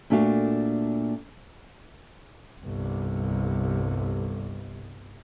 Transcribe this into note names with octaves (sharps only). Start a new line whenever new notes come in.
A#2 A3 D4 F#4 F5
G1 C2